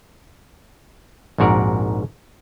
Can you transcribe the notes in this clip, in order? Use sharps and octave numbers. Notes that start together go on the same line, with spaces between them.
A#1 F2 G#2 F#4 A#4 D5